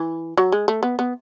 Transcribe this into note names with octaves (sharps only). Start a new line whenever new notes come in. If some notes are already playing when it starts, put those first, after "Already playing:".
Already playing: E3
F#3
G#3
A3
B3
B3